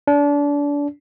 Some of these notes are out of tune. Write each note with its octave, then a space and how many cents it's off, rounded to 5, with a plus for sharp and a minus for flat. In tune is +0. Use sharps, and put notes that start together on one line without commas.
D4 -30